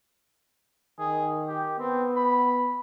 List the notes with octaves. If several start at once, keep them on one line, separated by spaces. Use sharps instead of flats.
D#3 G#4
G4
B3 C4
B5